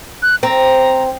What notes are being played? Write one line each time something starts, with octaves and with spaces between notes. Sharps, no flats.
F#6
C4 A#5